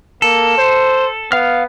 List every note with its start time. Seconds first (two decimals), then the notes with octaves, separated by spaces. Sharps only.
0.22 A#3 A4
0.58 C5
1.32 B3 F5 F6